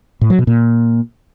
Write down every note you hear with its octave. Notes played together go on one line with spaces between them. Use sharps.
A2
F#3
B2
A#2